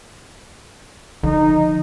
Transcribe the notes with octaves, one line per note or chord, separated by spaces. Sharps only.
D3 F3 D#4